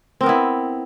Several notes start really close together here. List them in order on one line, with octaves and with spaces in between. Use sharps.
C4 A#4 B3 E4